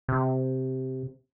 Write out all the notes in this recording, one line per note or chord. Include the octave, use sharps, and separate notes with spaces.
C3